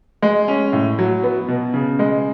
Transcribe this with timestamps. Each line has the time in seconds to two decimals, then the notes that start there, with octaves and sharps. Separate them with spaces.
0.22 G#3
0.48 C#4
0.73 A2
0.99 F#3
1.23 B3
1.48 B2
1.74 C#3
1.99 G#3